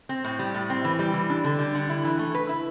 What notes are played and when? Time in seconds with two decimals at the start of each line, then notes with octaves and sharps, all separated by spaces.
0.09 C4
0.24 A2
0.39 G3
0.54 A2
0.70 C4
0.84 E3
0.99 G3
1.14 E3
1.30 D4
1.44 D3
1.59 G3
1.75 D3
1.89 E4
2.04 E3
2.19 A3
2.35 B4
2.49 E4